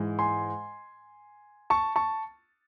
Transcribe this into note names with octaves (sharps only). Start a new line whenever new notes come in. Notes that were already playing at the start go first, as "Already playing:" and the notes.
Already playing: G#2 E3 G#3
G#5 C6
A5 C#6
A5 C#6